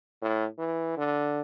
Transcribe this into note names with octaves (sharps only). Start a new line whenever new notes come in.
A2
E3
D3